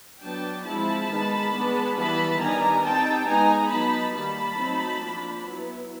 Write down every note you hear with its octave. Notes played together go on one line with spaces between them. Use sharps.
F#3 B3 D4 G5 A5
F3 G#3 C4 E4 A5 B5
D#3 G#3 B3 D#4
G#3 B3 D4
E3 G3 B3 A5 B5
D#3 G3 B3 D4 G#5 A#5
G3 C4 D#4 G5 A5
G#3 B3 D#4 G#5 A#5
F#3 B3 D#4 A5 B5
D#3 G3 A#3 A5 B5
F#3 A3 C4 D#4
F3 A#3 D4
F#3 B3 E4